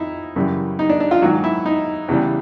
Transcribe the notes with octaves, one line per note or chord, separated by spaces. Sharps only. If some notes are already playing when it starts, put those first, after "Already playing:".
Already playing: F2 F3 D#4 E4
F#2 C#3 E3 G3
D#4
D4
D4
F4
G#2 D#3 F#3 F#4
E4
D#4
E2 C#3 E3 G3